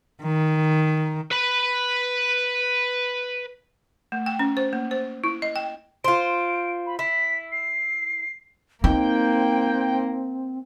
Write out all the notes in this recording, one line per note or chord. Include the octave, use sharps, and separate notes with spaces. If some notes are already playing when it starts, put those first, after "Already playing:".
D#3
B4 B5
A3
G5
C#4
C5
A#3
C5
E4
D#5
G5
F4 C5 D7
B5
E4 B6
C7
A#3 C4 D#4 G5